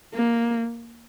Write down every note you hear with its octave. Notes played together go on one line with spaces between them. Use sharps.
A#3